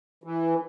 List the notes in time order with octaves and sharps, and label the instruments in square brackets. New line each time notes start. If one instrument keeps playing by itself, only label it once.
[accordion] E3